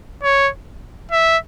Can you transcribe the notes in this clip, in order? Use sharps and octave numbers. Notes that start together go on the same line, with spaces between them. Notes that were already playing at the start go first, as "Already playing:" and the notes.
C#5
E5